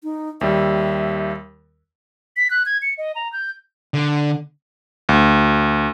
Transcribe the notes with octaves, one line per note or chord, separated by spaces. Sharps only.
D#4
D#2 G3 E5
B6
F#6
G#6
C#7
D#5
A#5
G6
D3
D2